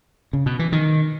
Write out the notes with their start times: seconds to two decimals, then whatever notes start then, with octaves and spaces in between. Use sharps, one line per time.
0.33 C#3
0.46 B2
0.59 E3
0.72 D#3